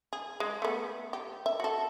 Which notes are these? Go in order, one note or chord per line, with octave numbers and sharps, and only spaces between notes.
G#4
G#3
A3 B3
G4
E5
F#4 A4